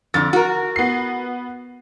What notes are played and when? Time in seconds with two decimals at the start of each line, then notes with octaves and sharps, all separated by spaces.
0.14 F2 D3 A6
0.33 F#4 A#4
0.76 B3 C7